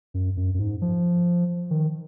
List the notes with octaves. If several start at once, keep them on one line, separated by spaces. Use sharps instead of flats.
F#2
F#2
F#2
G#2
F3
D#3